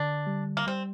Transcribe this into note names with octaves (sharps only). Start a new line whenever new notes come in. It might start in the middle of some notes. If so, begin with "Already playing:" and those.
Already playing: D3 D4
G3
A#3
G3 C4